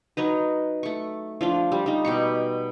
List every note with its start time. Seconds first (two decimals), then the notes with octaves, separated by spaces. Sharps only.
0.17 F#3 D#4 B4
0.83 A3 C#6
1.41 F3 D4 F4
1.72 G3
1.86 G3 D#4
2.05 B2 G4 C#6